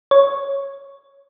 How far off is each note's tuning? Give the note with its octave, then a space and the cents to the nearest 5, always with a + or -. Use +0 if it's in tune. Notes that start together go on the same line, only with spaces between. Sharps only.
C#5 +0